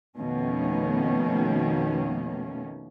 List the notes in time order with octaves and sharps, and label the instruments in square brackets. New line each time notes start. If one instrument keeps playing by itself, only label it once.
[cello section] F2 B2 D#3 A3 A#3 C#4